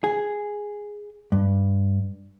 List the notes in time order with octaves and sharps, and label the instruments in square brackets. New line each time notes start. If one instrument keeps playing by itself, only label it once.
[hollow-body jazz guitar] G#4
G2